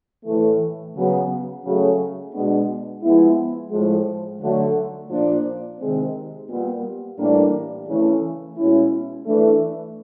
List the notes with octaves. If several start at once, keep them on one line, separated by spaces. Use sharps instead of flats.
A2 E3 A3
C#3 F#3 B3
C#3 F#3 A3
B2 G#3 B3 D4
F3 G#3 B3 E4
A2 F3 G#3
D3 F#3 A3
A#2 F3 A#3 D4
C3 D#3 G#3 C4
A#2 G3 B3
A2 E3 G3 A#3 D4
C#3 E3 A3
B2 G#3 C#4 E4
E3 A3 D4